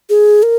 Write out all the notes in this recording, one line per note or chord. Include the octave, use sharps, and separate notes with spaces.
G#4
A#4